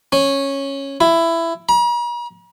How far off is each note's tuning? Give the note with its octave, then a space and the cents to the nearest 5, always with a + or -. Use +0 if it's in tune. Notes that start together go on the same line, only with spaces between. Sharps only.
C#4 -10
E4 +15
A#5 +45